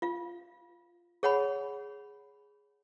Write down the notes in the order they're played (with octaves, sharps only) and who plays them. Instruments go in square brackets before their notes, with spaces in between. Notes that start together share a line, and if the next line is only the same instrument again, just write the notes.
[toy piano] F4 F5
G#4 C#5 F#5 G#5 B5